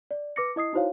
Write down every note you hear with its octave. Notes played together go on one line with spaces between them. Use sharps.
D5
B4 D6 A#6 C#7
E4 D#5 D#6 C7
D#4 E4 F#4 C5 C#5 F5